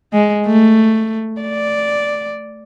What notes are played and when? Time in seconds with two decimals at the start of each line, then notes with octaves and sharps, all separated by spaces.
0.13 G#3
0.46 A3
1.41 D5